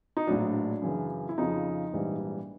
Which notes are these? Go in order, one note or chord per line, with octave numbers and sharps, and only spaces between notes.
D#4
A#1 A2 F#3 D4
F#2 C#3 E3
E4
F2 C#3 F3 D#4
A#1 G#2 E3 G3